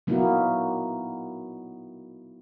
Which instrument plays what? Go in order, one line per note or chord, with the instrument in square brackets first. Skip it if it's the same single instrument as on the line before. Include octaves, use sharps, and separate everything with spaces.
[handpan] F#3 A#3 B3 D#4 E4 F#4